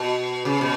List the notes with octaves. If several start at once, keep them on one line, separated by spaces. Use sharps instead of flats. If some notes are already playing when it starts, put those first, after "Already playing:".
Already playing: B2
C#3
B2